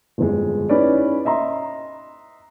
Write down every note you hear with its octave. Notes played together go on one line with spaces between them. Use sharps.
G1 F2 G#3
C#4 D#4 E4 B4 C#5 D5
D#5 E5 A#5 C6